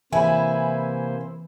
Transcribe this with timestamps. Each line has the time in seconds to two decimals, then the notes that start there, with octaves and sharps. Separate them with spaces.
0.13 C3 E3 A#3 E4 C5 G#5 B5